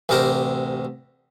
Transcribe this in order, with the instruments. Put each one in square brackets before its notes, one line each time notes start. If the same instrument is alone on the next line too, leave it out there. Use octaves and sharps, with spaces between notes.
[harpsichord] A1 D2 C3 G4 A#4 C5